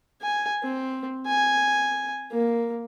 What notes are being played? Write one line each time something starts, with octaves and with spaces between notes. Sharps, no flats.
G#5
C4
G#5
A#3